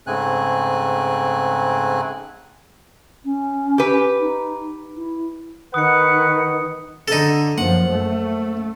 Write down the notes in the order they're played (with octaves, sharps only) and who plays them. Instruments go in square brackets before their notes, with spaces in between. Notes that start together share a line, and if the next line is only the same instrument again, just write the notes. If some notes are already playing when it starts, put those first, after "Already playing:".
[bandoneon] G#2 C#3 A3 C4 G#5 F#6
[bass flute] C#4
[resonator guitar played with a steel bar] G4 B4
[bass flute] D#4
E4
[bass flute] D#3 [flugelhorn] B4 [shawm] F#5 [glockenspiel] D#6 C#7
[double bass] D3 [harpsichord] D#4 A4
[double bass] F#2 F3 [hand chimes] A#3 C#4 C5 [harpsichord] F#5
[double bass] A3